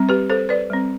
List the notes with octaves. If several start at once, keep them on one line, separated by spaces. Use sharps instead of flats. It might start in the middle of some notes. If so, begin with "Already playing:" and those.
Already playing: G3 C4
G4 B4
A4 C5
B4 D5
G3 C4